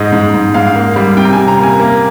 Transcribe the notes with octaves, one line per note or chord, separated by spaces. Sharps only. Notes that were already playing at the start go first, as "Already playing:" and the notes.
Already playing: G#2 D#5
G#2
G#2
G#2 F5
A#3
G3
C3 G5
A#5
G#5
C3
A#5
A#3 G#5
A#3